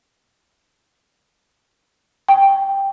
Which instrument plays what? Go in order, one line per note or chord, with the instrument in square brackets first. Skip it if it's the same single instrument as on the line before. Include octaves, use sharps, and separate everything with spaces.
[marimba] G5